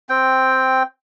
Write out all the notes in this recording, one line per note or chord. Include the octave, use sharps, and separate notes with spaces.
C4 G5